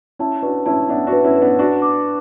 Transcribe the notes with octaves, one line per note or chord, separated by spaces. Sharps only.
C#4 E4 A5
D4 F#4 B4
C#4 E4 A5
B3 D4 E5
D4 F#4
B4
C#4 E4
B4
B3 D4
D4 F#4 A5
D6